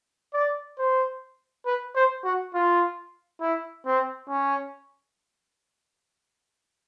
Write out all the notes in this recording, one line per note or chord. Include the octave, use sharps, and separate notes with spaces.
D5
C5
B4
C5
F#4
F4
E4
C4
C#4